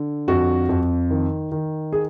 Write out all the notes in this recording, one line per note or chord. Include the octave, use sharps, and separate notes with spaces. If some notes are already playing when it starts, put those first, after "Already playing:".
Already playing: D3
F2 F#4
F2
D#3
D#3
G#4